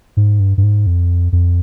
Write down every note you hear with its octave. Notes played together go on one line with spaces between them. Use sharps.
G#2
G2
G2
G#2
F2
F2